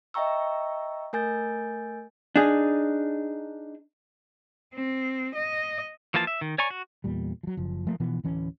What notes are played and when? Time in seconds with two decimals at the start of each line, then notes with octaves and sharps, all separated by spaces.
0.14 D#5 E5 G5 A#5 C#6 E6
1.13 A3 A#4 G#5 G6 A6
2.36 D4 D#4 G#4
4.74 C4
5.35 D#5
6.14 E3 F3 A#3 F4 A5
6.27 E5
6.41 D#3
6.58 C#5 D5 G#5 A#5 C#6
6.70 F#4
7.04 E2 A#2 G3
7.43 F3 F#3
7.57 F#1 F3
7.87 F3 A3 A#3
8.00 B2 E3 F3 B3
8.24 D1 E3 C#4